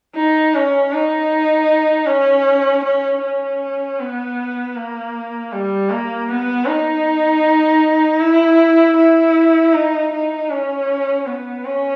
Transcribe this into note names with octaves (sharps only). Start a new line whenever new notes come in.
D#4
C#4
D#4
C#4
C#4
C#4
B3
A#3
G3
A#3
B3
D#4
E4
E4
D#4
D#4
C#4
B3
C#4